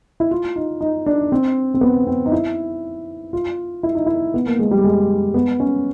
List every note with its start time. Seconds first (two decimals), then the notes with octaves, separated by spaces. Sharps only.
0.20 E4
0.31 F4
0.56 D#4
0.81 D#4
1.06 D4
1.32 C4
1.74 C4
1.81 B3
2.07 C4
2.26 D#4
2.32 E4
3.33 F4
3.83 E4
3.95 D#4
4.06 E4
4.34 B3
4.46 A#3
4.59 G#3
4.71 G3
4.84 G#3
5.34 B3
5.60 C#4